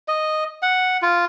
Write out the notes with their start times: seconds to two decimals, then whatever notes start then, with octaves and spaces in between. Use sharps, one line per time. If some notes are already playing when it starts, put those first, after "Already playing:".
0.08 D#5
0.62 F#5
1.02 F4